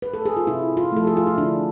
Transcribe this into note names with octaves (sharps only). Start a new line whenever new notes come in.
B4
A4
G#4
F4
C3 E4
F4
F3 A3 A4
G#4
F4
E4
D3 D4